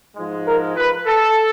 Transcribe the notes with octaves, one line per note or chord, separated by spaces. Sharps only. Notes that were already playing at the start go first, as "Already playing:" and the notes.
G#2 F3 G#3
A#4
B4
A4